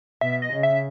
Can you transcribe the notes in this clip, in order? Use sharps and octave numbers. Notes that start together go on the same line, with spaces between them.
B2 E5
D#5
C#3
E5